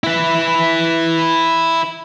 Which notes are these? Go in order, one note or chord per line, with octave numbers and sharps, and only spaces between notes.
E4 B4